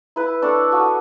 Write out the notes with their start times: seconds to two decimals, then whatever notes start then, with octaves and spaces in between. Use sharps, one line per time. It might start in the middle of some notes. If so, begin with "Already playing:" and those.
0.16 E4 B4
0.42 D4 A4 C#5 D5
0.72 F#4 D#6